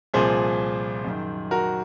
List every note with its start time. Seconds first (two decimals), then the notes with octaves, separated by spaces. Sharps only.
0.14 C2 A#2 F3 G#4 C5
1.05 F#2 D#3
1.51 F#4 A#4